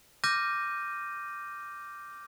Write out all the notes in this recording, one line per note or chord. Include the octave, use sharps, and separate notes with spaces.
D6 F6 G6 A#6 D#7